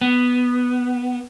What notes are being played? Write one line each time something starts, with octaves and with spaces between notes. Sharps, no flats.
B3